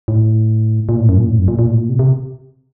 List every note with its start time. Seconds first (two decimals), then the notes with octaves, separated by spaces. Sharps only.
0.08 A2
0.89 A#2
0.99 A2
1.09 F#2
1.18 A#2
1.28 A2
1.39 F#2
1.48 A#2
1.59 A#2
1.68 A2
1.78 A#2
1.89 C3
1.99 C3